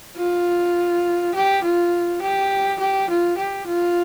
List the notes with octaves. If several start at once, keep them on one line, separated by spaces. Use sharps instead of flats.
F4
G4
F4
G4
G4
F4
G4
F4